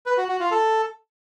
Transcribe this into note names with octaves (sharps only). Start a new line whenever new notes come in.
B4
F#4
F#4
F4
A4